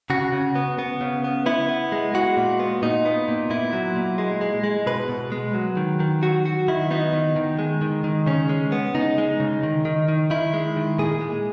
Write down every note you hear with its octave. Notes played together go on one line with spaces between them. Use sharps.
C#3 F#4
C#3
B3
B3
C#3
B3
B3 E4
B3
G#3
G#3 F#4
A#2
B3
A#2 D#4
B3
A#2
A#2 E4
F#3
A#2
G#3
G#3
G#3
B2 B4
B2
G#3
F#3
D#3
D#3
F#3 F#4
F#3 F#4
D#3 E4
B3 D#4
D#3
D#3
G#3
D#3
D#3
C#3 C#4
G#3
B3
C#3 D#4
G#3
C#3
D#3
D#3
D#3
D#3 E4
G#3
D#3
A#2 G#4
G#3